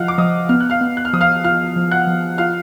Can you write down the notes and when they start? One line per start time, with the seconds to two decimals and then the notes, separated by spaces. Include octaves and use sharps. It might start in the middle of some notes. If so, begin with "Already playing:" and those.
Already playing: F3 F4 D#5 F5 F#5 F6 F#6
0.08 D6
0.18 F3 D#5 D#6
0.49 B3 F6
0.61 F#6
0.70 F5 F6
0.81 B3
0.97 F#6
1.05 F6
1.13 F3 D#6
1.21 F5 F6
1.44 F4 F5 F6
1.76 F3
1.92 F#5 F#6
2.07 F3
2.38 F4 F5 F6